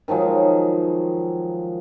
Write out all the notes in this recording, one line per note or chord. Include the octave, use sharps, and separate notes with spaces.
D#3 F3 F#3 G#3